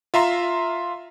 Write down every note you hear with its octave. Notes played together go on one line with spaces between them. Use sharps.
F4 E5 A#5 C6